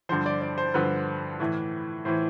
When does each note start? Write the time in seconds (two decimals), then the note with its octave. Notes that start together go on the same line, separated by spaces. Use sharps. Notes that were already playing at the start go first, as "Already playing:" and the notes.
0.09 G2 D3 F3 C5
0.26 D5
0.42 D5
0.58 C5
0.74 G2 D3 F3 B4
1.40 A2 E3
2.05 A2 E3 C5